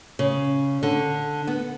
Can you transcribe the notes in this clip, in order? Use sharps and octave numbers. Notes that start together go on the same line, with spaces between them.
C#3
D3
B3